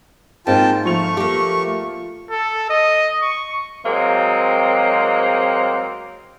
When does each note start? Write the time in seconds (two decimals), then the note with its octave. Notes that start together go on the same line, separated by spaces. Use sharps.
0.47 G#2 G#3 A#3 C4 F4 G5 A5
0.85 F3 A3 C#6 F7
1.17 A#3 G4
2.31 A4
2.70 D#5
3.22 C#6
3.86 F#3 G#3 A#3 C4